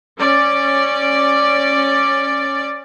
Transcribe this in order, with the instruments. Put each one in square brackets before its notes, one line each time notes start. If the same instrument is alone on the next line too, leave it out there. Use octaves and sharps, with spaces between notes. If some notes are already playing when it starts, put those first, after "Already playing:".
[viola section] C#4 D5